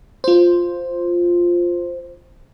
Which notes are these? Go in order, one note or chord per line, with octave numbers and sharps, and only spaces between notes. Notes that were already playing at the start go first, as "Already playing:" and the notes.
F4 C5